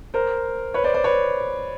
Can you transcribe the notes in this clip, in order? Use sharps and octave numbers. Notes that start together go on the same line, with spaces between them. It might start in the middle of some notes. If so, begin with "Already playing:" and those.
A#4 C5
B4 C#5
C5 D5
C5 D5
B4 C#5